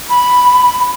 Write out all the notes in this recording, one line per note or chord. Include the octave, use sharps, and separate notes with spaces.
B5